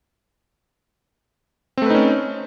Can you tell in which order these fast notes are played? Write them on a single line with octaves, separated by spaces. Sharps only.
C4 A3 B4 D#4 C#4